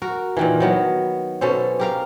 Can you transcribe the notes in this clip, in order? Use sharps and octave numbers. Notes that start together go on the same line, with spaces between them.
F#4 A#4
A#2 D#3 E3
D#3 F#3 B3
B2 C#4 A4 C5
G4 A#4 F5